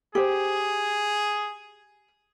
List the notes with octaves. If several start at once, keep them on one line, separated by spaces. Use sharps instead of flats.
G4 G#4 C5